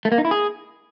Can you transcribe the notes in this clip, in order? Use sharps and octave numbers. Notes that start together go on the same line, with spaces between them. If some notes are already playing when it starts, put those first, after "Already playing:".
A3
A#3
D#4
E4
G#4